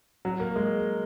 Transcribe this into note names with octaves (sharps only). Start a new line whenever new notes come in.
F#3
A#3
G#3